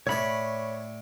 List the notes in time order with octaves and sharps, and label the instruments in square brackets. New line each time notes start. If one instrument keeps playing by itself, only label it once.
[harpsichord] A2 D5 [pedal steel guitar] C#5 B5